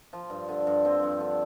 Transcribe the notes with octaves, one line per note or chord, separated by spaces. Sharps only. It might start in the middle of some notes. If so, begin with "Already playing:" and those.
F3
G2
D3
G2
F3 C4
G2
D3